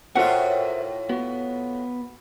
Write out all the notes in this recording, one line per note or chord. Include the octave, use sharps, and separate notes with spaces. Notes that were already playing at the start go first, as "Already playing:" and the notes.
A2 F4 F#4 A#4 C5 E5 F#5
B3 F#4